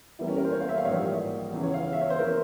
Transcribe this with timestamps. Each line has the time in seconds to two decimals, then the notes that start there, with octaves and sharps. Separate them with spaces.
0.19 E2 E3 G3 A#3 E4
0.28 C#4
0.37 A#4
0.44 C5
0.52 C#5
0.60 F5
0.69 E5
0.78 F5
0.85 A#1 G#2 E3 G3 A#3 C#5
1.53 E2 C#3 E3
1.63 C#5
1.74 F5
1.93 E5
2.01 C#5
2.10 C5
2.19 E3 A#3 A#4